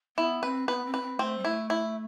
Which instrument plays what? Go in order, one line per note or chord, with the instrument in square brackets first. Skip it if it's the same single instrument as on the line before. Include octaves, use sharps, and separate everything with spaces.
[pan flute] B3 [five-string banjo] E4
[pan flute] C4 [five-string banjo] B4
[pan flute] B3 [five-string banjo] B4
[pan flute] C4
[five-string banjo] B4
[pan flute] C4
[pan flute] A3 [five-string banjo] C4
[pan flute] G3
[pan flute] A3 [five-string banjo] E4
[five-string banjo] E4